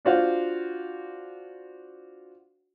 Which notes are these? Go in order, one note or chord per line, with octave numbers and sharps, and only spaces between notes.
D4 F4 F#4 C5 F5